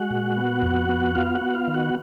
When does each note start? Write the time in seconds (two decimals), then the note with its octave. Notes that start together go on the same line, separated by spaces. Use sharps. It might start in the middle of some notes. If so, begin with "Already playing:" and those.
Already playing: G#3 F#4 F#5
0.11 A#2
0.37 B3
0.62 F2
0.89 B3
1.15 B3 F4 F5
1.35 F#4 F#5
1.41 B3
1.54 F4 F5
1.68 D#3
1.74 F#4 F#5